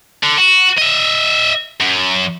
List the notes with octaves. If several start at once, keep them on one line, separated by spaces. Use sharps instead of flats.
D3
F#4
D#5 E5
F#2